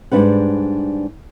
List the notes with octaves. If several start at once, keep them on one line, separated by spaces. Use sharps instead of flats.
G#2 G3 D4 B4 F#5